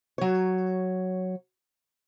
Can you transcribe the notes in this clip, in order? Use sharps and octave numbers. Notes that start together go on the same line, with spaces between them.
F#3 C#5